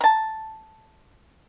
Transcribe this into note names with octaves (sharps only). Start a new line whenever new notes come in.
A5 A#5